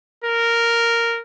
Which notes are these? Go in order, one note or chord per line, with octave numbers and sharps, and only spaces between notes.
A#4